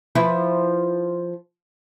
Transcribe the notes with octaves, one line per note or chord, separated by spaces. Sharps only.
F3 E4 B4